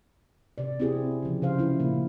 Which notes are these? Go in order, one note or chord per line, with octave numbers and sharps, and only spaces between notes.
C3 D5
C4 E4 G4 G#4
C#3 F3
C#3 G4 C5 F5
F3 E4
A#2 C#3 A#3